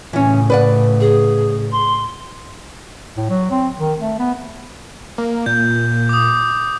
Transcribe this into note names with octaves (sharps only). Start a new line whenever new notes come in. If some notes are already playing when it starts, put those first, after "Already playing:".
A2 C#3 E3 C#4
B4 D5 F#5
G#4
C6
A2
F#3
C4
D#3
A3
B3
A#3
A#2 G6
D6 D#6